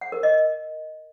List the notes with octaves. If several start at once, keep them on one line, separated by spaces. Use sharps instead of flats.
F#5
A#4
D#5